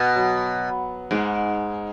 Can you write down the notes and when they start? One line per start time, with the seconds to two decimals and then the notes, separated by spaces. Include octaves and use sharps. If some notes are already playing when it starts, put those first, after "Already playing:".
Already playing: B2 B3
0.16 F#3
1.11 G#2 G#3